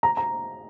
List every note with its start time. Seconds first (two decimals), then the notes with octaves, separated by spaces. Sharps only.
0.03 A#5
0.17 A#5